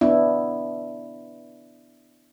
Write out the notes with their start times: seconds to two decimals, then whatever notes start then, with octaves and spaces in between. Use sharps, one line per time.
0.01 B3 D4 E4